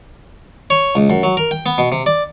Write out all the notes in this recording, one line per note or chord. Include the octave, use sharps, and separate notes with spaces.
C#5
C#2
F#2
F#3
A#4
G5
B3
B2
C3
D5